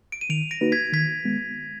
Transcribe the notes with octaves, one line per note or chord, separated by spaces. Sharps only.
D7
D#7
D#3 D7 F7
A#6 D7
A#3 D#4 F#4 B4
G#6 B6
D#3 G#6 B6
G#3 B3